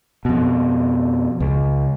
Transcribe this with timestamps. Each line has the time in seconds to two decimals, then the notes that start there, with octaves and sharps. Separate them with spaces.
0.25 F2 B2
1.40 C#2